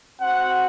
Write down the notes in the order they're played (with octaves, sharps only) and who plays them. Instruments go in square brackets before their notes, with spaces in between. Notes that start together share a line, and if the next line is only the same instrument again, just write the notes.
[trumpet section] C4 F#4 F#5